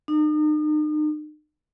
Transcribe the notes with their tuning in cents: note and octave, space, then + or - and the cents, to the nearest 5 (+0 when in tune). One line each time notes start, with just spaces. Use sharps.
D#4 -40